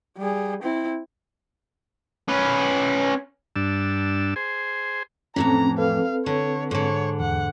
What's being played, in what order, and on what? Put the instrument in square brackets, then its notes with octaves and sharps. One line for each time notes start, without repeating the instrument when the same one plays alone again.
[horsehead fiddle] G3 G#4
C4 E4
[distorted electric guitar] C#4 B4
[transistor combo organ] G2 D4 E6
G#4 C5
[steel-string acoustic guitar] F2 A2 E3 [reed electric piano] C4 C#4 [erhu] A#5
[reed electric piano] C4 A4 B4 [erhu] F5
[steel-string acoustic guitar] D3 [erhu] C#5
[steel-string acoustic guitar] G#2 D3 [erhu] C#5
[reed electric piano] E2 [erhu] F#5